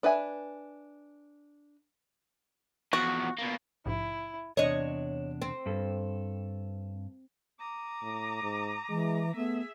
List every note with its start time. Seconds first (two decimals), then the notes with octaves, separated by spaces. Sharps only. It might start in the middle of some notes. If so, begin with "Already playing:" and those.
0.03 D4 B4 E5 G#5
2.93 E2 F3 F#4
3.39 B2 A#3
3.86 A#1 G#2 C3 E4
4.57 E2 C3 D4 C#5 D#5
5.42 C4
5.66 G2 A4
7.59 A#5 D6 D#6
8.02 A2
8.42 G#2
8.89 E3 G#3
9.36 A3 B3 G#4 E5